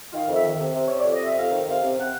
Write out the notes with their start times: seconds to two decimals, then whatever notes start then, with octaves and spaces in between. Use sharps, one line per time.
0.12 D#3 F5
0.28 F2 E5
0.44 D#3
0.53 E5
0.59 C3
0.74 C3
0.88 C3 C#5
0.99 D5
1.04 F2
1.12 D#5
1.20 C3 E5
1.36 F2 F5
1.51 D#3
1.67 C3 F5
1.83 C3
1.97 C3 F#5